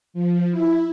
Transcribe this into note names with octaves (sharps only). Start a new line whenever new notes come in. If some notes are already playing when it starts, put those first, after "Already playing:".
F3
E4